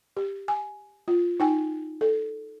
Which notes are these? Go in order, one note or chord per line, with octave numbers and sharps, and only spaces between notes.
G4
G#5
F4
D#4 G5 G#5
A4